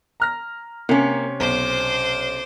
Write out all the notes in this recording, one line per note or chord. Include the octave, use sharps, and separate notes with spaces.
A#5 F6 A#6
C3 A#3 C#4
B1 C5 D6